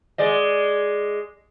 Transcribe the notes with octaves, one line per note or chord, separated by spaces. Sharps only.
G#3 D5 D#5